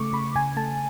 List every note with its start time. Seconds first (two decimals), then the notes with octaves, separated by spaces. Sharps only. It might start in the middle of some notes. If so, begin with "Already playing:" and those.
Already playing: C#3 A3 C#6 D6
0.13 C#3 B5
0.35 C#3 G#5
0.57 A3 A5